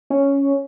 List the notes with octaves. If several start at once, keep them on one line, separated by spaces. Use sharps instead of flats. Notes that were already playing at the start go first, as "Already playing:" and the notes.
C#4